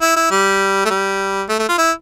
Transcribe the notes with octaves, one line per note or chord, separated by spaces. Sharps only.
E4
E4
G3
A3
G3
A3
A3
F4
E4